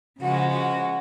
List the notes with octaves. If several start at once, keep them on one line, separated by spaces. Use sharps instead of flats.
C#3 F3 G#3 F#4
F#4